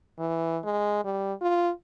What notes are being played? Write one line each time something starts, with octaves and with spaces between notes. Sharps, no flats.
E3
G#3
G3
F4